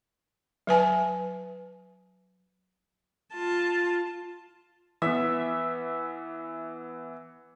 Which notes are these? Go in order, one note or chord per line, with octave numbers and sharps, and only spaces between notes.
F#3 B4 G#5 A5
F4 A5
E3 B3 E5